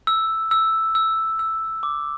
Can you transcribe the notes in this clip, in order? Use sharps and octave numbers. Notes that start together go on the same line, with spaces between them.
E6
E6
E6
E6
D6